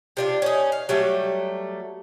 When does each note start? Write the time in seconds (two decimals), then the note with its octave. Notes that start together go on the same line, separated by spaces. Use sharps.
0.17 C3 D4 F4
0.42 C#4 D#4
0.72 F5
0.89 F#3 G3 A3